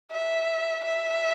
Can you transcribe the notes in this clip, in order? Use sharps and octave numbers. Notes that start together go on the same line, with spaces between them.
E5
E5